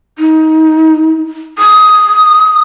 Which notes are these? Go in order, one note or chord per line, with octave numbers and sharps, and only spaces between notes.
D#4
D#6